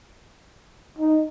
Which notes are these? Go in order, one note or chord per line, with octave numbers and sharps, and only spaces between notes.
D#4